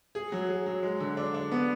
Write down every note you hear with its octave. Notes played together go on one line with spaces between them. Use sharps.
G#4
F#3
G#4
F#3
G#3
D3
D4
D4
B3